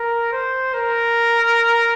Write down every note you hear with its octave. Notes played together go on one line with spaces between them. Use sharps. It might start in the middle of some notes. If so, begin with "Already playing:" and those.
Already playing: A#4
C5
A#4